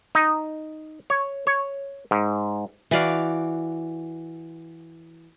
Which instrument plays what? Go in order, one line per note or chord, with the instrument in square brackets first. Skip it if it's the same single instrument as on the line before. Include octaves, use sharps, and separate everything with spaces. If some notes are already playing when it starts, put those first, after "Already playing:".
[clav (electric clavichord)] D#4
C#5
C#5
G#2
[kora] E3 F#4 D5 F5